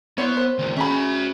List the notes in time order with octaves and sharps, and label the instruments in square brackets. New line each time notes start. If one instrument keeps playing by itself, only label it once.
[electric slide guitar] B3 [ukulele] E4 C5 C#5
[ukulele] C5
[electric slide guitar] A2 D#3
[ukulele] C#4 G#4 B5 [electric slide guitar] F#4 E5